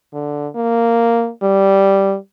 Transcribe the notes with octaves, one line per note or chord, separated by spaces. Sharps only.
D3
A#3
G3